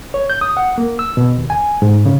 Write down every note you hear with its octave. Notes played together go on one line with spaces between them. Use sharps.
C#5
G6
D#6
F#5
A#3
E6
B2
D#2
G#5
G#2
C#3